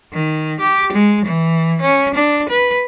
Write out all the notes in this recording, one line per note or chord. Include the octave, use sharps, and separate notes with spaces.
D#3
G4
G#3
E3
C#4
D4
B4